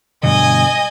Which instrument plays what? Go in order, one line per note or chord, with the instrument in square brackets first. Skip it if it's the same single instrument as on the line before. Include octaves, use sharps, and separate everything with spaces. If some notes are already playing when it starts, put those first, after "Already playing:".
[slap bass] G2 B2 D3 [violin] D#5 G#5